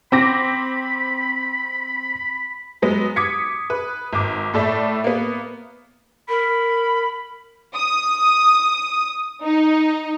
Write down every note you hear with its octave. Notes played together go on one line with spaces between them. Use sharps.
C4 B5 D6 A#6
F#3 G#3 B3
D6 D#6 G#6 B6 C#7
B4
G#1 D6
A2 A4 D5 E5
A#3 B3
A#4 B5
D#6
D#4